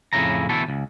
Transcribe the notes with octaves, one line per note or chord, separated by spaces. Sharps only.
F2 A2 C#3 E4 A#5
B2 D3 E3 A3 E4 A4
C#2